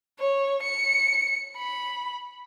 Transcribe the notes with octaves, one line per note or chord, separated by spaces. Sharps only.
C#5
C#7
B5